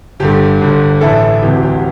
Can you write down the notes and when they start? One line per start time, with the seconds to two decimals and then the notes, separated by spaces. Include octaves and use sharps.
0.20 G1 G2 D3 G4
0.61 G1 G2 D3
1.01 A1 A2 E3 E4 A4
1.42 E1 D2 C3 E3 G4
1.63 G4